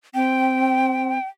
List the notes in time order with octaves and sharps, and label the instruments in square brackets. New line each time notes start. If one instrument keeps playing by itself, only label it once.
[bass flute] C4 [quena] G5